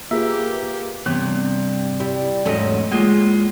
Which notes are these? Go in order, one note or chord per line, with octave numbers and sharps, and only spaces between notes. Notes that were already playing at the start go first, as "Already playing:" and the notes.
A#3 F4 G4 G#4 B4 E5
G2 C3 E3 B3
G3 E4
E2 G#2 F#3 A3 C#4 D#5
G#3 A#3 F4 G#4
E2